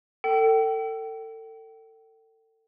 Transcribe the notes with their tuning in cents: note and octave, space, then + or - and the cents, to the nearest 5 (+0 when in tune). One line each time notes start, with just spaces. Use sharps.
A4 +30 G5 -30